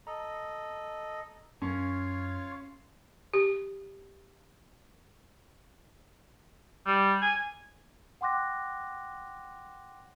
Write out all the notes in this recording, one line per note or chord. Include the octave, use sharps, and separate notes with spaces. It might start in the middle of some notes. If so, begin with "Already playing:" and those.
A4 D#5 A#5
F#2 C#4 F4 C#5 F5
G4
G3
G#5
F#5 G5 C6 D6 F#6 A#6